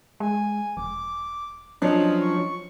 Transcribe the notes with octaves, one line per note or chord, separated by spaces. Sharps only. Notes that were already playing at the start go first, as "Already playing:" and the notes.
G#3 G#5
E1 D6
F3 F#3 C#4 D4 D#5
C#6